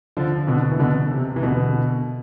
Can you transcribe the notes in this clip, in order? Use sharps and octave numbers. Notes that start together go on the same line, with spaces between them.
D3 F3
B2 D3
E3
B2 D3
C3
E3
B2 D3